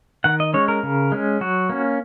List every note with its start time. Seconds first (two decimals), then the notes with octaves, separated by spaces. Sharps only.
0.24 D#3 F#5
0.40 D#5
0.54 G#3 C#4 C#5
0.68 A#4
0.83 C#3
1.12 G#3 C#4
1.41 F#3 F#4
1.69 A#3 C#4